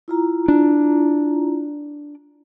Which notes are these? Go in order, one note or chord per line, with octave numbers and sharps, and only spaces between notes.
E4 F4 A#5
D4